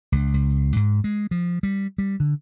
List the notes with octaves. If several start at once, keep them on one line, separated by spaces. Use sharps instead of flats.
C#2
C#2
G#2
G#3
F3
G3
G3
D3